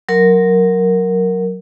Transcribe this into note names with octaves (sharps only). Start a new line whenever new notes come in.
F#3 A#4